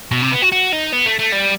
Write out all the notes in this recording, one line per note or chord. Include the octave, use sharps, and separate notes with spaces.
B2
C3
B3
F#4
F#4
D#4
B3
A3
A3
G3